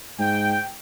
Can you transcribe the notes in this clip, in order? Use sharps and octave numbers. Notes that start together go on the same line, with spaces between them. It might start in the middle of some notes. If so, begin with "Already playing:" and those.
G#2 G5